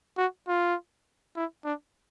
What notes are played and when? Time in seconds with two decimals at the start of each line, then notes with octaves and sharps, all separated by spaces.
0.17 F#4
0.48 F4
1.36 E4
1.64 D4